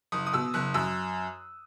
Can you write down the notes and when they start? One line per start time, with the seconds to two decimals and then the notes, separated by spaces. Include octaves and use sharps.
0.12 F#1 D#6
0.26 D#6
0.33 B2 E6
0.54 F#1 F#6
0.74 F#2 E6